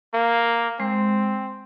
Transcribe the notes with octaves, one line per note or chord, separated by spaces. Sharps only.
A#3
G#3 C4